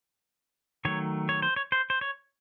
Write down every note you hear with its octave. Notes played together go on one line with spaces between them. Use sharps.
D#3 F#3 A3 C#5
C#5
C5
C#5
C5
C5
C#5